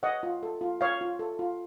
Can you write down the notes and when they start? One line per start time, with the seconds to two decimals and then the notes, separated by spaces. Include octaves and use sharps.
0.03 C#5 D#5 F#5
0.23 F4
0.43 A4
0.61 F4
0.81 C#5 F5
1.01 F4
1.19 A4
1.39 F4